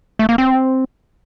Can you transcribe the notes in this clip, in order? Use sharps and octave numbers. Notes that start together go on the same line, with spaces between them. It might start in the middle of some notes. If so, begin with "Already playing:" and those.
A3
A#3
C4